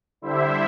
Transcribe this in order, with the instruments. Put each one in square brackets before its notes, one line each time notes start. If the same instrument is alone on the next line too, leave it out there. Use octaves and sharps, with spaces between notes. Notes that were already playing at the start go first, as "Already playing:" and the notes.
[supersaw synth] D3 G3 E4 C5 E5